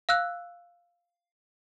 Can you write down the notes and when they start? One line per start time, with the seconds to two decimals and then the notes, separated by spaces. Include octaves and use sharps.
0.09 F5 E6 F#6